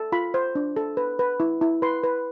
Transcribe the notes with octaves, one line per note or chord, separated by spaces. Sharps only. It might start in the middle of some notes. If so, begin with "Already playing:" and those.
Already playing: A4
F4 B5
C5
D4
A4
B4
B4
E4
E4
B4 C6
B4